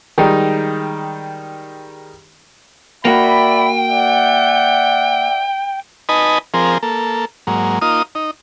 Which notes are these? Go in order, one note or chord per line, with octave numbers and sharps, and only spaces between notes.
D#3 G3 G#3 D#4
A#3 F#4 D5 E5 G5 B5
D5 E5 F#5
D#4 B4 D#5 G#5 A5 B5
F3 C4 G#4 A#4
A#3 A4
G#2 F#3 A#3
A#3 D#4 F4 D#6
D#4